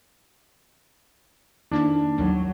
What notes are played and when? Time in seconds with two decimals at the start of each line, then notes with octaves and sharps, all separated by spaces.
1.72 F2 D#3 A#3 D4 E4
2.18 A1 D#2 F#3 G3